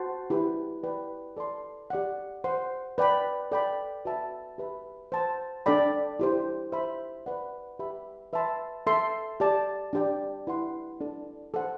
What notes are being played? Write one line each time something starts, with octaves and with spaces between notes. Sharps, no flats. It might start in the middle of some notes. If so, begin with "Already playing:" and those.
Already playing: F#4 C5 F#5 A5 C6
E4 G4 B4
B4 D5 G5
A4 D5 A5 C6
G4 D5 F#5
C5 F#5 C6
B4 D5 G5 B5
A4 D5 G5 B5
F#4 B4 E5 A5
G4 B4 E5 B5
C5 F#5 A5
D4 A4 D5 G5 B5
E4 G4 C5
C5 E5 B5
B4 D5 F#5
G4 B4 E5 B5
B4 E5 A5 C6
A4 E5 A5 C6
G4 D5 A5
D4 G4 D5 G5
E4 B4 F#5 C6
D4 A4 D5 A5
A4 C5 F#5